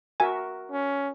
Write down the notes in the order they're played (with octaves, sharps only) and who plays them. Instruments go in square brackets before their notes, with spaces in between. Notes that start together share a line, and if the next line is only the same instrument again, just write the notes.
[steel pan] F#4 A#4 E5 [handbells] G#5
[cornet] C#4